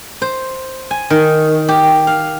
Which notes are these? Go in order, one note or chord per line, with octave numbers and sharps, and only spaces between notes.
C5
G#5
D#3
G4
F5